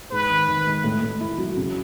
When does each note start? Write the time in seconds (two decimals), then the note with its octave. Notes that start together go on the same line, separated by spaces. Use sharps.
0.12 G#2 B4
0.30 D#3
0.48 D#3
0.66 G#3
0.84 A2
1.03 A2
1.21 E4
1.38 F#3
1.57 C#3